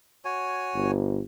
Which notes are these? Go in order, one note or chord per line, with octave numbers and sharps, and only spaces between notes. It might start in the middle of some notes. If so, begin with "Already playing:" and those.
F#4 C#5 G#5
G1